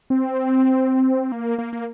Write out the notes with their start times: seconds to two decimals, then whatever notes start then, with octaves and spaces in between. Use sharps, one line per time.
0.10 C4
1.32 A#3
1.58 A#3
1.73 A#3